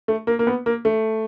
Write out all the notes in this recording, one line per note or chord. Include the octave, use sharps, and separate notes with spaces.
A3
A#3
A#3
B3
A#3
A3